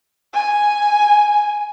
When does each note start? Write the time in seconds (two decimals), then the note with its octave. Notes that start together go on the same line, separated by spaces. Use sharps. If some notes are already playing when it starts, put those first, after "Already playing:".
0.34 G#5